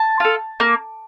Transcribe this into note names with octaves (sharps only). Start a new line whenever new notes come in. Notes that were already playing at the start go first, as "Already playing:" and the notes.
Already playing: A5
F4 A4
A#3